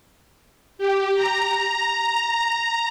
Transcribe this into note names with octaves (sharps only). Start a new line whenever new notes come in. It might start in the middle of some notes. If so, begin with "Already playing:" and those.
G4
A#5